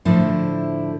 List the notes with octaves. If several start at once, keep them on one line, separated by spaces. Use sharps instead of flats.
A2 D3 F3 E4 A4 C5